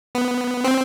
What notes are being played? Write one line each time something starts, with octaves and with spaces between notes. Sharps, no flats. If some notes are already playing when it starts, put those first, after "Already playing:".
B3
C4